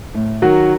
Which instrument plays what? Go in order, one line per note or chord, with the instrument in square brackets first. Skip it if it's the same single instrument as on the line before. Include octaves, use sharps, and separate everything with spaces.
[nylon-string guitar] A2
[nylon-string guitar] D#3 [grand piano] F#3 F#4